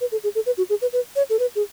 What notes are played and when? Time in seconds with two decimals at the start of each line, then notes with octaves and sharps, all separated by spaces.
0.01 B4
0.12 A4
0.24 G#4
0.35 A4
0.46 B4
0.58 F#4
0.70 G#4
0.82 B4
0.93 B4
1.16 C#5
1.30 A4
1.39 B4
1.56 G#4